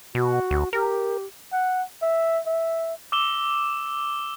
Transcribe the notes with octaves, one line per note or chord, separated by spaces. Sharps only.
B2 F#4
D2
G4 A#4
F#5
E5
E5
D6 E6 E7 G7